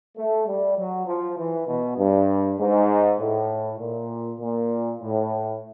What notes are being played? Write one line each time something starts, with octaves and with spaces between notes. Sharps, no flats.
A3
G3
F#3
F3
E3
B2
G2
G#2
A2
A#2
A#2
A2